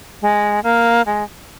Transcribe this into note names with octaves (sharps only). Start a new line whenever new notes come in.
G#3
A#3
G#3